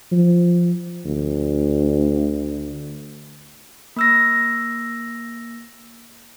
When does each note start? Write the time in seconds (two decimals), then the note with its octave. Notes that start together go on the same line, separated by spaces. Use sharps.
0.12 F3
1.05 D2
3.96 A#3 E6 A#6